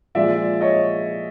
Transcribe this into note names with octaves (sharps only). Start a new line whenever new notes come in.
A#2 F3 G#3 D5 E5
C#5 D#5